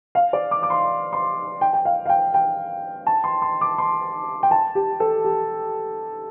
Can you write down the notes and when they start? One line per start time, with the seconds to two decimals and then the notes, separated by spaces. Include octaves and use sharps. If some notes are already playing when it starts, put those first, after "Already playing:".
0.15 F5
0.33 D5
0.51 D6
0.63 D6
0.70 C6
1.13 C6
1.61 G5
1.73 G5
1.85 F5
2.06 F5
2.09 G5
2.34 G5
3.07 A5
3.24 C6
3.42 C6
3.61 D6
3.78 C6
4.43 G5
4.51 A5
4.75 G4
5.00 A4
5.25 G4